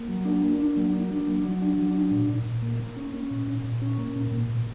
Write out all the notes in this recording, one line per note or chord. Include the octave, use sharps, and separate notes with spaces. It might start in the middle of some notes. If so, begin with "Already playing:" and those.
Already playing: A#3
F#3
D4
A#3
D4
F#3
A#3
D4
F#3
F#3
D4
F#3
D4
A#2
A#2
A#2
A#3
A#3
C#4
C#4
A#2
A#2
A#2
C#4
A#3
A#2
A#2
A#2